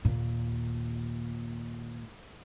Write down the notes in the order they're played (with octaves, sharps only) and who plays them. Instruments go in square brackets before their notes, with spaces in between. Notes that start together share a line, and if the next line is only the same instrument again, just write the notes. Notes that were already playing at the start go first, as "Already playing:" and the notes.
[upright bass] D#2 A#2